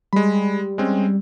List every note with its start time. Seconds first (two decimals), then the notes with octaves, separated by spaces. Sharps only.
0.13 G3 G#3 B5
0.78 G#3 C4 C#4